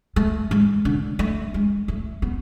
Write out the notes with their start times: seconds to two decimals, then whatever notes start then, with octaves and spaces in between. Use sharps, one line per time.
0.16 A3
0.51 G#3
0.85 D3
1.19 A3
1.54 G#3
1.88 A3
2.22 B3